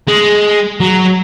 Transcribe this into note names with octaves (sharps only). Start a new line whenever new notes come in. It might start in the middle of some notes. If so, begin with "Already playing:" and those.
G#3
F#3